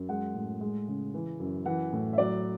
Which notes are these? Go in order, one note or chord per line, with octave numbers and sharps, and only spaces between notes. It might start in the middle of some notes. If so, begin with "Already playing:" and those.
Already playing: F#2
G#3 F#5
A2
G#3
C#3
E3
F#2
E3 F#5
A2
E5
F#3 D5